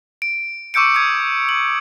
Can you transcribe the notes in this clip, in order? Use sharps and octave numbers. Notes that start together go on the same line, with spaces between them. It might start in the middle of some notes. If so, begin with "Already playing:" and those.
D7
C#6 D6 E6 G6 C#7 D7
D#6 G#6
F#7